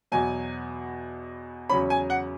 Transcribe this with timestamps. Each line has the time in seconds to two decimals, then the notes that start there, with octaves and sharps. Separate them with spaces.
0.12 E2 B2 F#3 G#5
1.70 E2 C#3 F#3 C#4 B5
1.90 G#5
2.10 F#5